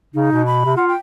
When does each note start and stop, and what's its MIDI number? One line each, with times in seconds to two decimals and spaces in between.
0.14 0.30 49
0.14 0.45 63
0.32 0.60 47
0.46 0.76 83
0.65 0.75 48
0.77 0.94 65
0.77 0.88 78
0.88 0.97 79